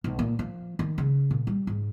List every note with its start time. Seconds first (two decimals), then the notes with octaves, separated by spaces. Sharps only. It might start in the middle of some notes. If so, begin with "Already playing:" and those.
0.04 B1
0.19 A#2
0.39 F3
0.79 D#3
0.98 C#3
1.31 A#2
1.47 G3
1.67 G#2